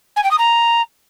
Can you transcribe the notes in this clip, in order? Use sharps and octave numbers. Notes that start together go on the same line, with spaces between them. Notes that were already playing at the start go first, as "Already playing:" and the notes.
G#5
G5
D#6
A#5